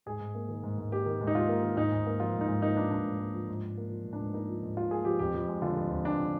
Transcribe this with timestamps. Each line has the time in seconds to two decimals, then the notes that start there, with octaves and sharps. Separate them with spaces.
0.06 G#2 G#4
0.20 G#2
0.35 A#3
0.49 D#3
0.63 G#2
0.78 G#2
0.91 A#3 G4
1.06 D#3
1.21 G#2
1.27 D#4
1.35 G#2 F4
1.48 A#3
1.63 D#3
1.77 G#2 D#4
1.92 G#2
2.06 A#3
2.20 F3 F4
2.35 G#2
2.41 D#4
2.48 G#2
2.62 A#3 D#4
2.77 F3 D4
2.91 G#2 D4
3.06 G#2
3.20 A#3
3.34 F3
3.48 G#2
3.63 G#2
3.77 A#3
3.91 F3
4.05 G#2
4.13 D4
4.19 G#2
4.34 A#3 D#4
4.49 F3
4.63 G#2
4.76 G#2 F4
4.91 A#3 G#4
5.05 F3 G4
5.19 F2 G4
5.34 F2
5.48 G#3
5.62 D3 F4
5.76 F2
5.91 F2
6.04 G#3 D4
6.19 D3